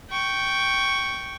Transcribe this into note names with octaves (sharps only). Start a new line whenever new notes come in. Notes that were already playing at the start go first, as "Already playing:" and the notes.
G5 C#6